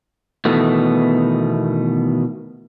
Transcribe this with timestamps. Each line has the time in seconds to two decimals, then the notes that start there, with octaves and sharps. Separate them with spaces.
0.45 B2 D#3 E3 A3 B3